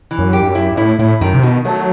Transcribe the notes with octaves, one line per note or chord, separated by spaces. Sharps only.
E3
F#2
G4
G2
F#2
E4
G2
A2 E4
A2 E4
F#2 D#3
C3
B2 D#3
F#3 A3